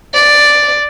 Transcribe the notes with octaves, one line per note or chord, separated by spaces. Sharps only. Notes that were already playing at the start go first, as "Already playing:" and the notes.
D5